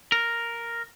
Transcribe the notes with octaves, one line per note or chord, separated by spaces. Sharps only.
A#4